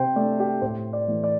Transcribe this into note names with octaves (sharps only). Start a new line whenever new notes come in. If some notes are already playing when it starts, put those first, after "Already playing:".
Already playing: C3 C5 G5
A3 D4 D5
G4
A2 C5
D5
E3 A3
D5